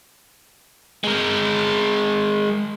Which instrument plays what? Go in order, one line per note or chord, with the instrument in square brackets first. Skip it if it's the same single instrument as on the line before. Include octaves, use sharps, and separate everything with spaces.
[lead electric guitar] G#3 A#4